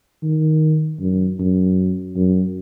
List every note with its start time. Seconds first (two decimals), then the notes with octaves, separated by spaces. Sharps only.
0.23 D#3
1.00 F#2
1.39 F#2
2.16 F#2